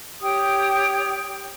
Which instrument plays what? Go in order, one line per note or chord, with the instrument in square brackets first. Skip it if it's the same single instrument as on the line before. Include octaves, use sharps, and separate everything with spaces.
[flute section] G4 C#5 G5 D#6